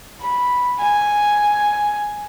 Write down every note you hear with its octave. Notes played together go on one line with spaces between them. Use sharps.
B5
G#5